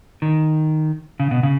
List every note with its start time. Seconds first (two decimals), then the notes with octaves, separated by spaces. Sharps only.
0.22 D#3
1.20 C#3
1.31 B2
1.43 C#3